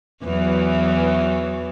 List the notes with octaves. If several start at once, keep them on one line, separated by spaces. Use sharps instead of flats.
E2 E3 F#3